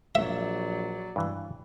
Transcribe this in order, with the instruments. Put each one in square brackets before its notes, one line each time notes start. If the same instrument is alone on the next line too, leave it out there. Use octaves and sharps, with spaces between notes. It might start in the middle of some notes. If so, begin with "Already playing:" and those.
[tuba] A#1 [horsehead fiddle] F#3 D5 [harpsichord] E5
[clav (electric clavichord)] G2 E3